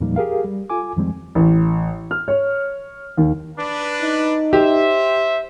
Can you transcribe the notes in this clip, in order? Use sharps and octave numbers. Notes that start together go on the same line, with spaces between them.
E2 A#2 F3 G3 A#3 D#4
G4 G#4 A#4 F5
G3
F4 A4 G#5 D6
F2 D#3 F3 G3 G#3 C4
A1
F6
C#5
D#2
D4 B4
D#4
G4 C5 E5